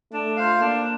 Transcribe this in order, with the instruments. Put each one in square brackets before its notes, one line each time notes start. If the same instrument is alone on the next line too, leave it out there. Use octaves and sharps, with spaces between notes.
[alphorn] A3 [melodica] D4
[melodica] F4 C5 F5
[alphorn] A#3 [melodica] D4